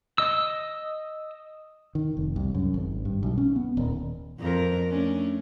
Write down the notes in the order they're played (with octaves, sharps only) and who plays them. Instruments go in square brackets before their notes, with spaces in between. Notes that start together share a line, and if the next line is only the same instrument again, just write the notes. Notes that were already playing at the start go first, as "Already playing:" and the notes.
[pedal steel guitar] D#5 E6
[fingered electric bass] D#3
F1
C2
F#2
G#1
G2
B1
C#4
B3
D#1
[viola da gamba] F2 A#4
A3 C#4 D4